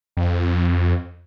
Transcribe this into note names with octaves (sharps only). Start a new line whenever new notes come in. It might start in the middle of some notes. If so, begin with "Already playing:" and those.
F2